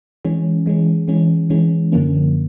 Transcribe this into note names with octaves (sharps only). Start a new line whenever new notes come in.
E3 G#3 C#4
E3 G#3 C#4
E3 G#3 C#4
E3 G#3 C#4
F#2 D3 F3 A#3 C#4